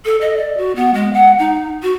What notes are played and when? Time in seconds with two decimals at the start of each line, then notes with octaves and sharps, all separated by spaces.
0.05 A4
0.21 D#5
0.37 D5
0.57 F#4
0.76 B3
0.94 G#3
1.13 F#5
1.39 D#4
1.83 F#4